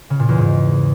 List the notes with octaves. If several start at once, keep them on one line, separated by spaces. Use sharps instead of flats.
C#3
A#2
E2
G#2